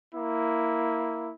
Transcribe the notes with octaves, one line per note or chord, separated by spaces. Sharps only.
A#3 E4